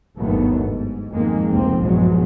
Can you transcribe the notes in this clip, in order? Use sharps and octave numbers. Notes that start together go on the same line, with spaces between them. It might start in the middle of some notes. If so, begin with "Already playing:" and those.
G1 D#2 G#2 F#3 A3 B3
G#2
F2 G#2 D#3 G#3 A#3
F1 C#2 F3 A#3 C4
A#1 E2 G2 F3 F#3 G#3